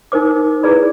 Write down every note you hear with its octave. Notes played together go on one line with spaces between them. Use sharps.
D#4 A#4 C5 D6
E4 G#4 B4 D5 B5